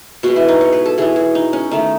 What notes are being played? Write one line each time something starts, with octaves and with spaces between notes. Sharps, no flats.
B2 G#3 B3 F#4
E4
D#4
C#5
B4
A4
E3 B3 G#4
F#4
D#4
C#4
D#3 A3 D#4